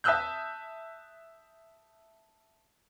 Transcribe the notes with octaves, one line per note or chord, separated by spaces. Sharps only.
E5 A5 D#6 E6 F#6 G6